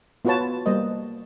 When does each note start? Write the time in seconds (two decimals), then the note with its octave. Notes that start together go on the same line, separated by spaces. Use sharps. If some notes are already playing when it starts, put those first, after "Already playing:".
0.25 B3 F4 F#4 B4 C#5 A5
0.66 G3 A#3 C5 D#5